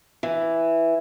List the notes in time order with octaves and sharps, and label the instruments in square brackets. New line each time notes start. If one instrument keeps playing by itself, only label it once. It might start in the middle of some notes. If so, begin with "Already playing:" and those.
[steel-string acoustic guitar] E3